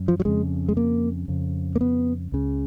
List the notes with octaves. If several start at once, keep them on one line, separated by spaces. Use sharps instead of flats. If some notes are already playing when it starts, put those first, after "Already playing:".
Already playing: F#2
F3
F#3
F2 C#3 G#3
G#3
A#3
F2 C#3
A#3
B3
C#2 C#3